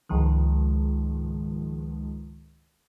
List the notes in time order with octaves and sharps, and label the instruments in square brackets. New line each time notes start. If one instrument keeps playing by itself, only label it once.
[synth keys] C#2 G#2 D#3 F3 G#3